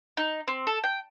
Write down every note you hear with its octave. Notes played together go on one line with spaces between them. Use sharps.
D#4
C4
A4
G5